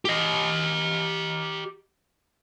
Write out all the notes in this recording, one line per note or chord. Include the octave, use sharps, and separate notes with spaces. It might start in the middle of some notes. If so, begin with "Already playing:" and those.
G4 D#5